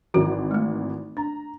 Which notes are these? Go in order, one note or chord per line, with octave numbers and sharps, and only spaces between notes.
G#1 D#3 E3 F#4 A#4
G#3 A3
D4 A#5